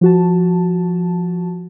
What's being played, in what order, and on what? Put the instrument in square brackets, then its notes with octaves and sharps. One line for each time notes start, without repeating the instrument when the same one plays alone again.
[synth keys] F3 F#4 A5